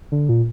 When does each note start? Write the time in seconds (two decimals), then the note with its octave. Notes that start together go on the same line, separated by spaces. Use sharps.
0.12 D3
0.29 A#2